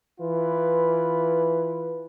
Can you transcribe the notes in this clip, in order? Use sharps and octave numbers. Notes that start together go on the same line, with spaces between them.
E3 F4 B4